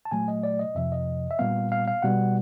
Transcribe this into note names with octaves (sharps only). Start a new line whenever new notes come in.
A5
A#2 F#3 A3 G#5
D#5
D5
D#5
F2 C3 F3 E5
D#5
E5
A#2 G3 B3 F5
F5
F5
B2 G3 B3 F#5